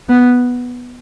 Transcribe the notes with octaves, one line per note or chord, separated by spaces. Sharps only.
B3